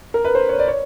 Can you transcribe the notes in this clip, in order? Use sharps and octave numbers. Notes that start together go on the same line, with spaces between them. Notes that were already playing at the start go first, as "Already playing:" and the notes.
A#4
B4
C5
C#5
D5
C#5